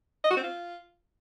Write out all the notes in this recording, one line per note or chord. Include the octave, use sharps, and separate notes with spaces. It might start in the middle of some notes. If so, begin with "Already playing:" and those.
D#5
F#4
C4
F4